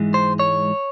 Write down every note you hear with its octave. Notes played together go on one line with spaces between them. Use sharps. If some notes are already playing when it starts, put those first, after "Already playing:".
Already playing: G#2 E3 G#3
C5
C#5